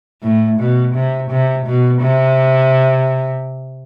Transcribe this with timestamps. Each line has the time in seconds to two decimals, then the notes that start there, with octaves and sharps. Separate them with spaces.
0.23 A2
0.60 B2
0.95 C3
1.30 C3
1.66 B2
2.02 C3